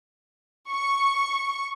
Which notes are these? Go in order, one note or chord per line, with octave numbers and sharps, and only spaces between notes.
C#6